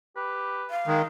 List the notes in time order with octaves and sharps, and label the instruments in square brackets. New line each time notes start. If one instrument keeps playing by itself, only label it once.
[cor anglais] G4 [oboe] B4
[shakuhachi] F5
[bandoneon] D#3 [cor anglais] G#3 [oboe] D#4